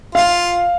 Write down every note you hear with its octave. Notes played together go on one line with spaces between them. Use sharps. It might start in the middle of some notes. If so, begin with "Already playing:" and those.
F4 F5